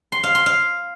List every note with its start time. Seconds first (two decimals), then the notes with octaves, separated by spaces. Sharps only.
0.12 C6
0.23 F5
0.35 C6
0.46 F5